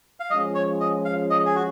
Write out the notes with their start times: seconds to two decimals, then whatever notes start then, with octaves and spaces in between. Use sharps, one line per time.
0.20 F5
0.30 F3 G#3 C#4 F4 D#5
0.55 C#5
0.80 D#5
1.05 F5
1.30 D#5
1.45 G#4
1.55 F#4